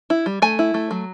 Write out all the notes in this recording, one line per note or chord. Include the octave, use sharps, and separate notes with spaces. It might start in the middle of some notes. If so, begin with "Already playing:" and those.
E4
G3
A3 G#5
E4
A3
F#3